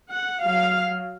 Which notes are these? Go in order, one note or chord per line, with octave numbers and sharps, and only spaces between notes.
F#5
F#3 F5